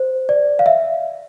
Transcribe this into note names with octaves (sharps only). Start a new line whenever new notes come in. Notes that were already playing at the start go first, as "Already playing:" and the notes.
Already playing: C5
D5
F5
E5